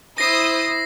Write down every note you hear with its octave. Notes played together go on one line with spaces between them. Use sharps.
E4 C5 D#6 A#6 C7